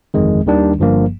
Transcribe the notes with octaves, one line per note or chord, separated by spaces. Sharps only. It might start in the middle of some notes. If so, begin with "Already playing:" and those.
G1 F2 D#3 G#3
D#2 D#3 G3 D4
G1 G2 F3 A#3